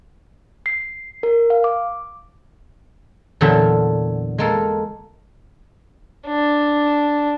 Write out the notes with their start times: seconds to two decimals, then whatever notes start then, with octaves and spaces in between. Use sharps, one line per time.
0.66 C7
1.23 A#4
1.50 F5
1.64 D6
3.41 E2 A#2 D3 F#3 A4 E5
4.38 G#3 A#3 A4
6.27 D4